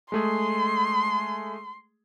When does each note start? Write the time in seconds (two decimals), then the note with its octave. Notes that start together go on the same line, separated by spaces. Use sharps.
0.12 G#3 A3 G#4 C6